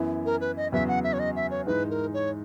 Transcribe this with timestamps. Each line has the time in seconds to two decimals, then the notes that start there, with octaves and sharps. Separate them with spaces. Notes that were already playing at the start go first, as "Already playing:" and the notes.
Already playing: F#2 E3 B3 E4
0.26 A#4
0.41 B4
0.57 D#5
0.72 E2 C#3 F#3 B3 E5
0.88 F#5
1.04 E5
1.13 C#5
1.19 D#5
1.36 E5
1.51 C#5
1.66 G#2 E3 G#3 D#4 B4
1.90 A#4
2.14 C#5